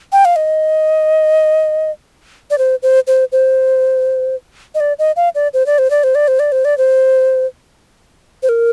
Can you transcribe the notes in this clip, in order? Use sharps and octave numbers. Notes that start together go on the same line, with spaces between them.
G5
F5
D#5
D5
C5
C5
C5
C5
D#5
D5
D#5
F5
D5
C5
D5
C5
D5
C5
D5
C5
D5
C5
D5
C5
C5
A#4